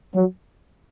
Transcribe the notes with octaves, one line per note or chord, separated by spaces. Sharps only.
F#3